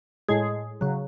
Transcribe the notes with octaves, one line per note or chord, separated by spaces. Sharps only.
A2 G#3 G#4
C#3 F#3